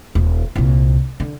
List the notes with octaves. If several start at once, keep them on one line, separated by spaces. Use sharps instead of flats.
D#1
C2 A#2
D3